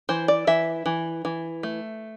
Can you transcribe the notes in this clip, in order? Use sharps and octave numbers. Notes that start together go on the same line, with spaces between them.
E3 C5
D5
E3 E5
E3
E3
A3